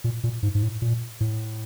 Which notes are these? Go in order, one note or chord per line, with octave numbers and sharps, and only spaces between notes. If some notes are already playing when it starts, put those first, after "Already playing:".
A#2
A#2
G#2
G#2
A2
A#2
A2